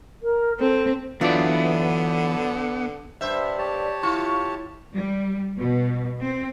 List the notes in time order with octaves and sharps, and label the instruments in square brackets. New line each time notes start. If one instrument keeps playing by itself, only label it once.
[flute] A#4
[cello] C4 [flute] A4
[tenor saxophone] D3 [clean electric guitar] E3 D5 [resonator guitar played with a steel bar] F#3 D4 F4 [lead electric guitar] B3
[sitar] G2 C5 E5
[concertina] G4 C#5 A5
[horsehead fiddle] E4 [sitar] F4 [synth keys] C#6
[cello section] G3
B2
C4